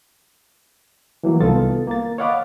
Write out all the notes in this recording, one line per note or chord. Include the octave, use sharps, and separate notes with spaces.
E3 F#3 A#3
C2 D#3 B3 F4 A4 A6
A#3 A6
C#5 D#5 F5 F#5 B5 D6